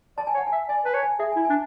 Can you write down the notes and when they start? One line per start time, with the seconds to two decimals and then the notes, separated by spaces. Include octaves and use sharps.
0.17 D5 A5
0.27 G#5
0.34 C#5
0.37 F#5
0.47 E5 G#5
0.69 D5 G#5
0.85 B4 A5
0.94 C#5
1.03 G#5
1.19 G#4 E5
1.32 G#5
1.36 E4
1.45 G#5
1.49 D4